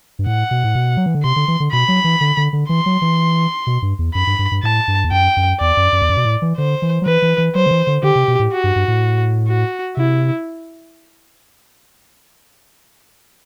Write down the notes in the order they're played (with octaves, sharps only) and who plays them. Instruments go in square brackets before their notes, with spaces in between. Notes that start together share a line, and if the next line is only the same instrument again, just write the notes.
[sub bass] G2
[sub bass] A2 [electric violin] F#5
[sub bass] B2
A2
B2
F#3
E3
D3
[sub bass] C3 [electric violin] C6
[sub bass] D3
E3
D3
[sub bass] B2 [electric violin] B5
[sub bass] F#3
E3
D3
D3
D3
[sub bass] E3 [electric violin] C6
[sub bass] F#3
E3
B2
G2
E2
[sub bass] F#2 [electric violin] B5
[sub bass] G2
G2
G2
[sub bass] A2 [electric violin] A5
[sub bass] G2
E2
[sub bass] F#2 [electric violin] G5
[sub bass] F#2
[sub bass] E2 [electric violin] D5
[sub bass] F#2
F#2
E2
F#2
B2
A2
E3
[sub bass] D3 [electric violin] C5
[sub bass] E3
F#3
[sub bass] E3 [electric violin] B4
[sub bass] E3
E3
[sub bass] F#3 [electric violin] C5
[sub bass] D3
E3
D3
[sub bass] D3 [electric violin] G4
[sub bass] C3
B2
A2
[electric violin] F#4
[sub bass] G2
G2
A2
[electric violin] F#4
[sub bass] C3 [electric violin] E4